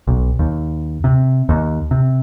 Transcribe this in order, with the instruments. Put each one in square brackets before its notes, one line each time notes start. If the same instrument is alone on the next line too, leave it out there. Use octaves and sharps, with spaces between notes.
[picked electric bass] B1
D#2
C3
D#2
C3